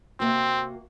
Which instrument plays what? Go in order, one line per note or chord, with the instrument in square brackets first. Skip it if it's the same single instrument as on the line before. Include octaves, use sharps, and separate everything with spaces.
[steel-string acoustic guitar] C3 A#3 F#4 [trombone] C4